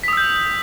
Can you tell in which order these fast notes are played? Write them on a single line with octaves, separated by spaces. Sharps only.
B6 D#6 E6 G6